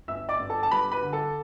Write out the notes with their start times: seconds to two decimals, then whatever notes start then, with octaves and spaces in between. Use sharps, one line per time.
0.08 G1 E5 E6
0.29 D5 D6
0.40 G1
0.50 A4 A5
0.63 A5
0.71 G2 B4 B5
0.91 B4 B5
1.02 D3
1.13 A4 A5